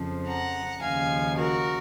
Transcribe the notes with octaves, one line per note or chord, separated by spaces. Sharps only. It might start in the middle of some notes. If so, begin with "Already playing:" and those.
Already playing: F2 C#3 F3
F#5 A#5
D#2 C#3 F3 F5 G#5
F#4 A#4